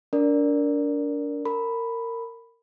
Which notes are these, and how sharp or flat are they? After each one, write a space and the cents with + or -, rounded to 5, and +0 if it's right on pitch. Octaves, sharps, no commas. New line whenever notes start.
D4 -30 A#4 +0 D5 +0
A#4 -20 B5 +0